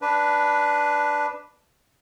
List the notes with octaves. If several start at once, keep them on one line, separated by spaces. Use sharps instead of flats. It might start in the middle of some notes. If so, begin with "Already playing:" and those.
D4 B4